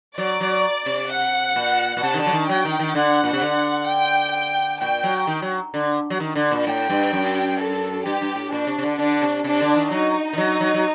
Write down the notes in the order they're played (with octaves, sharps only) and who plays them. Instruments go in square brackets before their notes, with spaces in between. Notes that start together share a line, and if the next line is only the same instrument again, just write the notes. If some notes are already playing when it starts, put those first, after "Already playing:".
[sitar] F#3 [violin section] D5
[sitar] F#3
C3
[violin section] F#5
[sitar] A#2
A#2
[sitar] C3 [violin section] A5
[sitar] D#3
D3
F#3
D#3
[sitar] F#3 [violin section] G5
[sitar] D#3
D#3
[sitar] D3 [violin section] F#5
[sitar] A#2
C3
D3
[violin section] G5
G5
[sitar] A#2 [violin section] G5
[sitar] F#3
D#3
F#3
D3
F#3
D#3
D3
A#2
[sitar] A2 [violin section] G5
[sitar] G2
F#2
[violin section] A4
[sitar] G2 [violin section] G4
[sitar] G2
A2
[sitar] A#2 [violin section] D4
[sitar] C3
C3
D3
[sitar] D3 [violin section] D4
[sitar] C3
[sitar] C3 [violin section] D4
[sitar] D3
D#3
[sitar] F#3 [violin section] D#4
[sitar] D#3
F#3
F#3
F#3